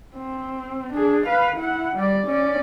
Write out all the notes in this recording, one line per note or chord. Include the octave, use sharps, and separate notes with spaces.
C4
D4 G#4
B4 F5
E4 F#5
G3 D5
C#4 D5